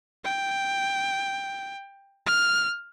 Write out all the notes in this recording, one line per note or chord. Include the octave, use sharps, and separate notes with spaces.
G5
F6